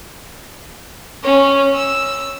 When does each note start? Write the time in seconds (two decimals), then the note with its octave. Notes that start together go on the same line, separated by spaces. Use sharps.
1.24 C#4
1.75 E6